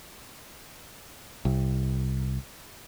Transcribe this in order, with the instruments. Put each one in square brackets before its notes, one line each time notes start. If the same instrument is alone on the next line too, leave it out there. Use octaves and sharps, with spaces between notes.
[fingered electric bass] C2